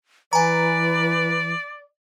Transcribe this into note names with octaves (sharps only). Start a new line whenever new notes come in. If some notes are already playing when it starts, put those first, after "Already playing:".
E3 B4 D5 G#5 A#5